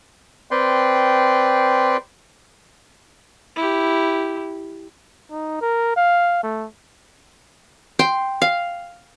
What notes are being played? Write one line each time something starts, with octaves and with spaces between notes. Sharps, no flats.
C4 B4 D5 G5 C6
E4 G4
D#4
A#4
F5
A3
G5 C6
F5